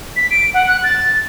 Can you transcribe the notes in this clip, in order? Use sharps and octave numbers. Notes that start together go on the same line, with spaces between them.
B6
D7
F#5
F#6
A6